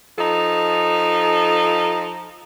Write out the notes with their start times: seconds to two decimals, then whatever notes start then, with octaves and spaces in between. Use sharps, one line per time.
0.18 F3 D#4 A4